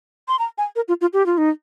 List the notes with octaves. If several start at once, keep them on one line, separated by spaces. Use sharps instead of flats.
C6
A#5
G#5
A#4
F4
F4
G4
F4
D#4